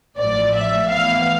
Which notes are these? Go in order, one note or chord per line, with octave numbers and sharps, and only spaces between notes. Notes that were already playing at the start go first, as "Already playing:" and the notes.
A1 A2 F3 D5
E5
A2 E3 B3 F5